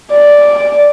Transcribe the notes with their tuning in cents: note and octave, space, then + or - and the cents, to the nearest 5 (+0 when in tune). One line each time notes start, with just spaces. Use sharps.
D5 -5